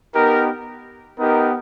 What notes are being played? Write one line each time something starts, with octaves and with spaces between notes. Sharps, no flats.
B3 D#4 G4 A#4
B3 D#4 G4 A#4